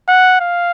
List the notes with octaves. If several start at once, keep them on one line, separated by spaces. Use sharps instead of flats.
F#5
F5